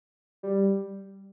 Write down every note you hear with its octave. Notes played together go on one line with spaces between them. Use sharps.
G3